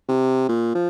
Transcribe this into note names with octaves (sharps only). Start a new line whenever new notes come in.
C3
A#2
F3